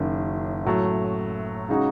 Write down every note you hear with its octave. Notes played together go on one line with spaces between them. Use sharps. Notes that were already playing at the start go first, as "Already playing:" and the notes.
Already playing: F#1 F#2 D#3
A2 F#3 A3
C#3 G#3 D#4 F#4